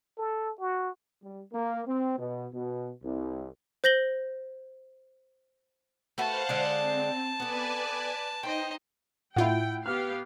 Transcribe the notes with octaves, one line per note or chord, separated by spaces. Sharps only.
A4
F#4
G3
A#3
C4
B2
B2
C2
C5 G6 A#6 F#7 G7
A3 F#4 B4 C5 F5 F#5 A5
D3 G#3 D4
C4
B3 A4 B4 D5 G#5
D#4 C5 D#5 G5
A2 E4 F4 F#5 G5
B3 G4 F5 F6